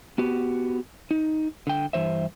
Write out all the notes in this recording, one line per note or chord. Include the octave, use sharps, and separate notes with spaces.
B3 F#4 G4
D#4
D3 G5
G2 E3 C5 E5